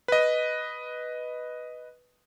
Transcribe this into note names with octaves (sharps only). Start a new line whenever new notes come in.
B4 D#5